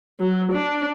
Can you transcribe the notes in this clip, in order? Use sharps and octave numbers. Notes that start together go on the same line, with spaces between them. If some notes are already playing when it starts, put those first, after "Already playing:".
F#3
D4